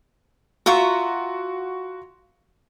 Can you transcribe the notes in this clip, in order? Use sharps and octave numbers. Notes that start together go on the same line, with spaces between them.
F4 F#4 E5 A#5 C#6